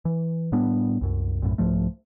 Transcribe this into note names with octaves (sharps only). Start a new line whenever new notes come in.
E3
A2 G3 B3 D4
C2 F#2
B1 F#2 A2
C2 G#2 F3 A3